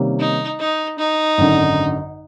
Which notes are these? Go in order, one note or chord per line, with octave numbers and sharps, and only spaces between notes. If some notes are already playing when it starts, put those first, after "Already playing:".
Already playing: C3 D#3 G3 A#3 C#4
D#4
D#4
D#4
G#1 F#2 D3